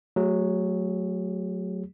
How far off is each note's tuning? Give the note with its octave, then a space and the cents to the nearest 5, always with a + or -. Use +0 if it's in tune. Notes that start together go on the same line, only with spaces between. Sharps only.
F#3 +0 A3 +0 G#4 -35